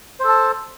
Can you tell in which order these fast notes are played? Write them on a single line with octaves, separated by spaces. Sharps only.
C5 A4 A5